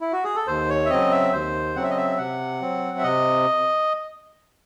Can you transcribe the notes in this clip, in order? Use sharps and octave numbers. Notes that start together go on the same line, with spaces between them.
E4
F#4
G#4
A4
D#2 C5
C#5
E5
C#3 F#3 C4 D#5
E5
D#2 C5
C#3 F#3 C4 F#5
E5
D#5
E5
C3 F#5
F#3 C4
E5
C3 D#5